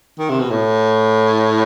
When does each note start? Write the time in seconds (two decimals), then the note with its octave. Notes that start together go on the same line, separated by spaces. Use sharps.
0.19 D#3
0.30 C3
0.40 B2
0.51 A2